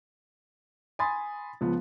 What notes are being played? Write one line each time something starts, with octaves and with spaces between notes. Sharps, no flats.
G#5 B5 C6 D#6 A6
C#2 F3 B3